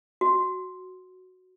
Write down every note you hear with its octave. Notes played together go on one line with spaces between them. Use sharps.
F#4